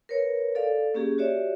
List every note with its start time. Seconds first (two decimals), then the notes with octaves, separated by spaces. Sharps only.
0.09 A#4 B4 C#5
0.55 A4 D5 F5
0.94 A#3 C#4 G4 G#4
1.18 F#4 G4 C#5 D5 E5